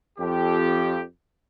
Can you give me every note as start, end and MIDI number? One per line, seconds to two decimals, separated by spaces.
0.19 1.02 41
0.19 1.02 67